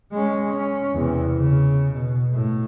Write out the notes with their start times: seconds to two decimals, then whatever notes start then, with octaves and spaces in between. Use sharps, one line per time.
0.12 G#3 C#4
0.48 C#4
0.94 E2 C3
1.38 C#3
1.93 B2
2.34 A2